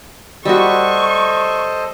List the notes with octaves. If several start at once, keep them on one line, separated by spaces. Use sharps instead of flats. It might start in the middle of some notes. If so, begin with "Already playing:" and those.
G3 F#4 A4 C5 D#5 C#6